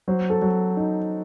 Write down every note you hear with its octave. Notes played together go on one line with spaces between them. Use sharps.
F#3 C5
A4
F#3
D#4